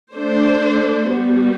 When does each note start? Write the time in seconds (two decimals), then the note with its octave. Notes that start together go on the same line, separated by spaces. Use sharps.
0.14 A3 D4 A4 C5
1.07 G3 B3 F#4